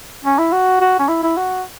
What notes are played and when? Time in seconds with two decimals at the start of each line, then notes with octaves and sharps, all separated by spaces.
0.25 C#4
0.38 E4
0.52 F#4
0.81 F#4
0.99 C#4
1.09 E4
1.23 E4
1.37 F#4